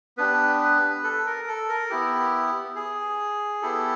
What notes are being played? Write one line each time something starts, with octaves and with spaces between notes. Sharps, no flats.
B3 D4 G4 B4
A4
A#4
A4
A#4
B3 E4 G4
G#4
B3 E4 G4 A4